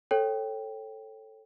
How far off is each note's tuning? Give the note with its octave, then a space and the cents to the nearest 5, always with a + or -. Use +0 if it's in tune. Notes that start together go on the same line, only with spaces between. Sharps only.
A4 +0 C#5 -25 G5 +0